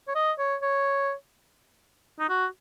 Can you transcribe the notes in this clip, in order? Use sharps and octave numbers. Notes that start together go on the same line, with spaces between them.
C#5
D#5
C#5
C#5
D#4
F#4